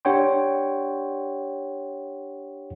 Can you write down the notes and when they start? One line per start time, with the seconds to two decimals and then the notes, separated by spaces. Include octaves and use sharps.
0.05 D4 G4 C#5 F#5 G5 C6